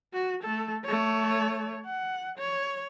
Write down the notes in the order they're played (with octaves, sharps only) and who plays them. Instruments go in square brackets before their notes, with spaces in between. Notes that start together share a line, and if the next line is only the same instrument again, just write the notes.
[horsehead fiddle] F#4
A3 A4
A3 C#5
F#5
C#5